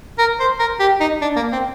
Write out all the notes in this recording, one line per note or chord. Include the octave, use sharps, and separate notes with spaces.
A#4
C5
A#4
G4
D#4
D4
A#3
C4